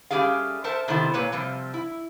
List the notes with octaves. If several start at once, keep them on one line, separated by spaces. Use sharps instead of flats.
G3 A3 C#4 G4 G#4 F5
A4 A#4 C5 E5 A5
C3 D#3 A3 B3 E4 C5
A#2 A#3 B4 C#5
C3 F3 G3 C4
E4